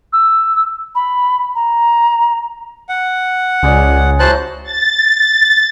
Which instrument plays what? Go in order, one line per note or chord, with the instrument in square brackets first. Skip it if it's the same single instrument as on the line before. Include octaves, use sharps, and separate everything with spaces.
[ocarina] E6
B5
A#5
[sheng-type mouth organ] F#5
[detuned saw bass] C#2 [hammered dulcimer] G#3 C#5 D5
[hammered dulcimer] F#3 E4 A#5 [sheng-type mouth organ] C5 A5 F#6
[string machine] A6